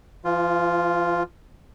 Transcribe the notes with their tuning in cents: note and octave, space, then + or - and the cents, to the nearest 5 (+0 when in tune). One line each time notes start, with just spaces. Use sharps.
F3 -45 F4 +0